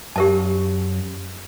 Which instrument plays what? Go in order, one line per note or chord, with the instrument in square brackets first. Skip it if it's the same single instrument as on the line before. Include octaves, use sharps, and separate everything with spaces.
[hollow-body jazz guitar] F#2 [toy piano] G4 A#4 A5